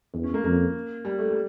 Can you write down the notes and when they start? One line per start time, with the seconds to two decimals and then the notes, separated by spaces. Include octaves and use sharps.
0.14 E2
0.24 C#4
0.34 A#3
0.44 F2 A#3
1.05 G3
1.18 A3
1.31 G3